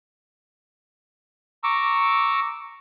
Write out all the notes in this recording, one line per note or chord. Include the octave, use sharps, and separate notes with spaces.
A#5 C#6 D6 E6